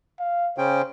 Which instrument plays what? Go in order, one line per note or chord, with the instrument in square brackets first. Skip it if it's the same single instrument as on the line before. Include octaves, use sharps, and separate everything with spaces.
[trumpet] F5
[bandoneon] C#3 C#4 G5 [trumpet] C5